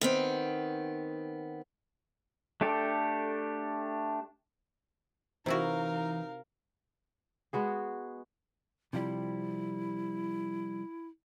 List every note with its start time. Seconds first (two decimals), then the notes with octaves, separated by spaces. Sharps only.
0.01 D#3 B3 C4
2.61 A3 D4 G4 A4
5.46 C3 E3 D#4 E4 F#4 A#4 F5
7.53 G#3 B3 F#4 G#4
8.93 C3 F3 G3 E4